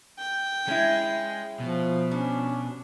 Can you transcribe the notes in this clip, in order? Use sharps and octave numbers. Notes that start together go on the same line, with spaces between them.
G5
G#3 C#4 E4
B2 F3
G3 C#4 D4